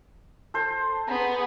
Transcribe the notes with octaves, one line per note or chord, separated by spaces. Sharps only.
A4 C5
B3 G#4 A#5